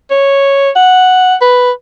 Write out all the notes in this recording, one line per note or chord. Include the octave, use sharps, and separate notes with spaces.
C#5
F#5
B4